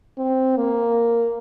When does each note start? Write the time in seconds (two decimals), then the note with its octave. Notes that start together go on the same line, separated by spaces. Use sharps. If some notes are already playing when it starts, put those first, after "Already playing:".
0.18 C4
0.57 A#3